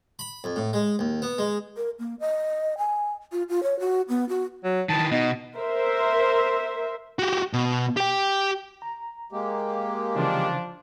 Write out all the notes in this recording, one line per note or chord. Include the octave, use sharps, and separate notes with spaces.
B5
F2
A2
G#3
D#2
B3
G#3
A#4
A#3
D#5
G#5
F4
F4
C#5
F#4
B3
F#4
F#3
D#3 E3 A5
B2 D#4
A#4 C5 E5
F#4 G4
B2
G4 G5
A#5
G#3 A#3 G4
C#3 E3 F3 D4